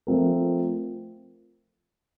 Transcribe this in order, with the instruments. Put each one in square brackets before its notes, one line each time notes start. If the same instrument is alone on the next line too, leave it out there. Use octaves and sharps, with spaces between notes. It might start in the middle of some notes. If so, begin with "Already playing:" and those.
[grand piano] F3 A3 C4 F4 A#4